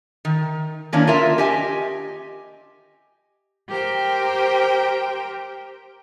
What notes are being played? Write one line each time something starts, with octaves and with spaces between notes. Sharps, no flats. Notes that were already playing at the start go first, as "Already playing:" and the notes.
D#3
D#3 A#3 C#4 D4 E4
F4 A#4 E5
G4 D#5 G#5
G4 A#4 C5 G5